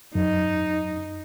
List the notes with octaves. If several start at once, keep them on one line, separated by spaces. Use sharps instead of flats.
F#2 D#4